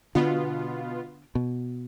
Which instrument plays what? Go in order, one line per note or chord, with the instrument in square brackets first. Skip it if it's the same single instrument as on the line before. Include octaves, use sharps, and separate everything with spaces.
[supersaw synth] B2 B3 F4 [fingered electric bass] D3
[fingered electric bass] B2